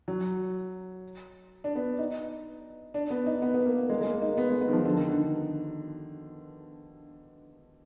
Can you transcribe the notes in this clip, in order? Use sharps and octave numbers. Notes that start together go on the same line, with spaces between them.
F#3
D4
B3
D#4
D4
B3
D#4
B3
B3
A#3
A#3
G#3
G#3
A#3
D#4
B3
G#3
B3
D#3
F3
D3
D#3
D3